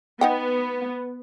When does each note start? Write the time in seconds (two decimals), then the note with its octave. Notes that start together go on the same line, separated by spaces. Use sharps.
0.21 B3 D#4 F#5 G5